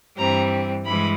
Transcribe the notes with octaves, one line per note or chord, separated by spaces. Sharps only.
G2 E3 G3 C4 A#5
G2 E3 G#3 B5